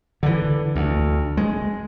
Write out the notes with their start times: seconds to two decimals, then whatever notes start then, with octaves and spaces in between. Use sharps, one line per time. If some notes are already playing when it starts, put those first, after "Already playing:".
0.23 D3 E3
0.75 D2
1.37 G#3